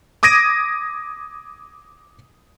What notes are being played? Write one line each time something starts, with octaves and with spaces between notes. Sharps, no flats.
D6 D#6 G#6 A#6 D7 D#7